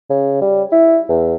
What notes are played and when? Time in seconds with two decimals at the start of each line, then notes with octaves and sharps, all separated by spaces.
0.10 C#3
0.41 G3
0.72 E4
1.09 E2